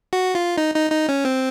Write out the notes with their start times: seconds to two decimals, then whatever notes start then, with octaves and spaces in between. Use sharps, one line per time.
0.13 F#4
0.35 F4
0.58 D#4
0.75 D#4
0.91 D#4
1.09 C#4
1.25 C4